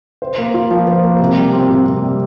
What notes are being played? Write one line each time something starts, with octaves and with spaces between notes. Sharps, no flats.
C5
A#3
F4
F3
C5
A#3
C3
G3
C4
C3
C3
G3